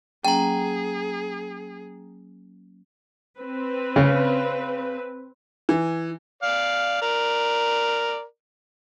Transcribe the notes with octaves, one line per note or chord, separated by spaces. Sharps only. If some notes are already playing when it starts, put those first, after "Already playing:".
F#3 A#3 C#4 G#4 G5 A#5
C4 B4
C#3
E3
D5 F5
A#4 D5